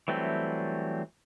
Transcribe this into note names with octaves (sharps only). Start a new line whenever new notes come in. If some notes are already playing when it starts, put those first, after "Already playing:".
E3 F#3 G3 A3 C4